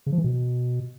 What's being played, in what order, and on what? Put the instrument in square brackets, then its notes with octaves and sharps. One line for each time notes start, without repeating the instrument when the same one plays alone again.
[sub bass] C#3
F3
E3
B2